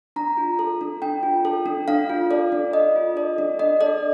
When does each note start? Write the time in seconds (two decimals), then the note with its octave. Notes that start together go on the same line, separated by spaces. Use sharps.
0.16 D4 A#5
0.37 F4
0.59 A4
0.81 D4
1.02 D4 G5
1.23 F4
1.45 A4
1.66 D4
1.88 D4 F5
2.10 F4
2.31 A4 D5
2.52 D4
2.73 D4 D#5
2.96 F4
3.17 A4 D5
3.38 D4
3.59 D4 D#5
3.81 A4 D5